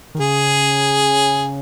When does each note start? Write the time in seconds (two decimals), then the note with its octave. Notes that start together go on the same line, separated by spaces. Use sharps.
0.15 D#3
0.19 C#3 G#4